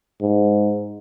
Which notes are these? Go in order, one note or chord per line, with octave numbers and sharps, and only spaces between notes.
G#2